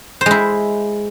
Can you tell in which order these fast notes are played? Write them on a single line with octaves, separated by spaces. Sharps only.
C5 G#3 E4